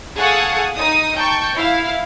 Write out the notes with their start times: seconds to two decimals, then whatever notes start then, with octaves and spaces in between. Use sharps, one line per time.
0.18 G#4 A4 F5 F#5 C#6 D#6
0.76 D#4 D#6
1.16 G5 A5 C#6 G6
1.56 E4 F5